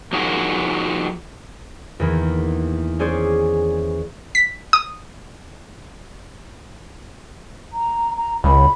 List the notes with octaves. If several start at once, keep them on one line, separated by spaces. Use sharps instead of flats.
F3 D#4 F#4 G#4 A#4
E2 D#3 E3 A#3
C#4 G#4 C5 D5
B6
D#6
A#5
A#5
C#2 B5